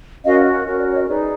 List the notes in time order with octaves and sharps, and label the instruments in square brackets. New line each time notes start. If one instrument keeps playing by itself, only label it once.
[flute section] C#4 F#4 A#4 D#5 F5
C#4 F#4 A#4
D5
C#5 D#5
D#4 G#4 B4 D5